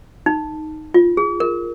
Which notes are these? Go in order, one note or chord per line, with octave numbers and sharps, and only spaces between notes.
D#4
F4
G#4
A#4